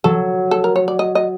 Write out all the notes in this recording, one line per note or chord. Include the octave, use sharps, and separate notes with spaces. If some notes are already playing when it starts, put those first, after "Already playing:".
F#3 A4
A4
A#4
C#5
D5
D#5
D#5